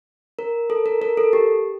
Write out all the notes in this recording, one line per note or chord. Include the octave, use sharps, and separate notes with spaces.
A#4
A4
A#4
A#4
A4
G4